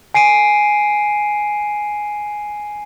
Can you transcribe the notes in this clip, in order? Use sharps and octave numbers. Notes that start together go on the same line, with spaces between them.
G#5 C7 D7 D#7